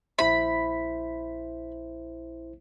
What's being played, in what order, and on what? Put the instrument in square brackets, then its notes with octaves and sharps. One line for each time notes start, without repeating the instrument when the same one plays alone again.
[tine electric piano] A#1 E4 C5 [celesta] E5 [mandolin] B5